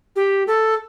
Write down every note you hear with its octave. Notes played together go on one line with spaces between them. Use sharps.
G4
A4